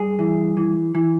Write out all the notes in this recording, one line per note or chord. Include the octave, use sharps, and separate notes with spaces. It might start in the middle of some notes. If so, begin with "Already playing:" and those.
Already playing: G2 G#4
E3
E3
E3